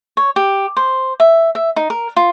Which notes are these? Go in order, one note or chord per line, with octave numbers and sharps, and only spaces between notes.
C#5
G4
C5
E5
E5
D#4
A#4
F4